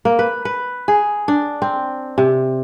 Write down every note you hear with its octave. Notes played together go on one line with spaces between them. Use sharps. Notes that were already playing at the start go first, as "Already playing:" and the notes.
A#3
B4
B4
G#4
D4
C4
C3